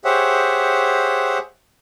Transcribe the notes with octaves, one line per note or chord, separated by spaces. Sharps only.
G4 G#4 C5 C#5 E5 F#5